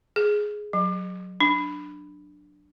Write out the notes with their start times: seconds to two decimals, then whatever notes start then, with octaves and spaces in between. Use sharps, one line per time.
0.16 G#4
0.73 F#3
1.41 D4